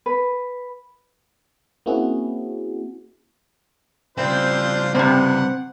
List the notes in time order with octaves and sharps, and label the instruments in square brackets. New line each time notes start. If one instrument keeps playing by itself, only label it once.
[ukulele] B4
[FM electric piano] A#3 C4 C#4 E4 F#4 G#4
[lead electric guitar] C#3 G3 [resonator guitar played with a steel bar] C4 [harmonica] D4 F4 C5
[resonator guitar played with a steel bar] G2 C3 [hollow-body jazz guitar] C4 [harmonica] F#5